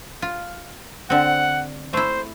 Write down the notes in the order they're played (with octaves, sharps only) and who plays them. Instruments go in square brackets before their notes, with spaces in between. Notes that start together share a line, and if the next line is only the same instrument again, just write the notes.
[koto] F4
[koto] D3 C4 [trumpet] F#5
[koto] A3 E4 [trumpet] C5